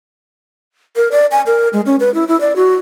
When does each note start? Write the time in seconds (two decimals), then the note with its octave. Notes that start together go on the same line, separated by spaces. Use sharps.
0.96 A#4
1.12 D5
1.31 G#5
1.46 A#4
1.73 G#3
1.86 C#4
2.00 B4
2.14 E4
2.28 E4
2.41 D5
2.56 F#4